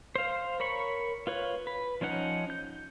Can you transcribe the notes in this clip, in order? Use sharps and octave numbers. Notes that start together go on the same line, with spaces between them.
C5 F5
A#4 C#5 B5 C#6
F4 B4 C#5
B4
F3 C#4 D#4 F#5
G6